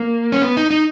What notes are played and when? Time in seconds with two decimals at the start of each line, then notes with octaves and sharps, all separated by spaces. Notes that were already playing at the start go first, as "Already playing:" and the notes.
Already playing: A#3
0.32 C#4
0.42 B3
0.57 D#4
0.71 D#4